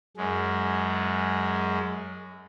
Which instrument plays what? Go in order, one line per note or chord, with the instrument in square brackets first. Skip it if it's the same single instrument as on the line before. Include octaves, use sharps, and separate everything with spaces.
[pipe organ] F#2 G#3